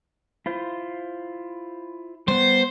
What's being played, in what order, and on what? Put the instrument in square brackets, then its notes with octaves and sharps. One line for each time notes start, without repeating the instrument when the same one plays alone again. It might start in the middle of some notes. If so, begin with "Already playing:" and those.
[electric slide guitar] E4 F4 C5
[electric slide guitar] G3 B3 [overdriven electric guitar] C5